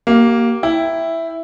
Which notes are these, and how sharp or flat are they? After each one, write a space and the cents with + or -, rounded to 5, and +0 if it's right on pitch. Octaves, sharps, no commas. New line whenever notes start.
A#3 +0 G4 -30
E4 +0 G5 +5